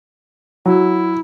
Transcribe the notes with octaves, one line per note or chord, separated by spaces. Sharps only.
F#3 E4